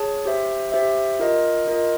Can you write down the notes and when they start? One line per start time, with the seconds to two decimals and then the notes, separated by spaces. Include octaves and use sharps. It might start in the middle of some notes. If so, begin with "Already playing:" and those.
Already playing: G#4 C#5 A5
0.25 G4 C5 E5
0.72 G4 C5 E5
1.20 F4 A#4 D#5
1.67 F4 A#4 D#5